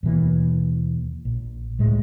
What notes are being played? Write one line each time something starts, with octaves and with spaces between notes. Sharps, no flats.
D#2 B2 E3 A#3
A#1
C#2 A2 G#3